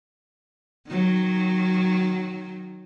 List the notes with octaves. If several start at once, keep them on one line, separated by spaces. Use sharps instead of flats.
D#3 F#3